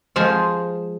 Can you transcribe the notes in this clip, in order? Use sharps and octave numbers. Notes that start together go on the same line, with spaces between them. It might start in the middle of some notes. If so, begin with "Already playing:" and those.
F3 G#3 G#4 C5